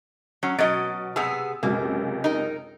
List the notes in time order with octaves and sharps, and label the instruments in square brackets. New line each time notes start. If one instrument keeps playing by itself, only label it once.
[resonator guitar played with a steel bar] F#3 C#4
[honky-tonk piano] B2 A6 D7 [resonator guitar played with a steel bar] F#3 C#4 D#5
[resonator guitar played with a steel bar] C3 B3 G#4 [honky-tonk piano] E6 F7
[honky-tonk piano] C#2 F#2 C3 [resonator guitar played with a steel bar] A#3
[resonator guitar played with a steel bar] D#4 A#4